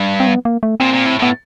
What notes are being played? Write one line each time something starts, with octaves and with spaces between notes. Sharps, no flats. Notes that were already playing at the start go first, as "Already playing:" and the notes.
Already playing: G2
C4
B3
A#3
A3
A#2 C4
A#2
A2
A2 B3